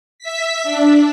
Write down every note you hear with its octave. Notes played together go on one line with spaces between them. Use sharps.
E5 B6
D4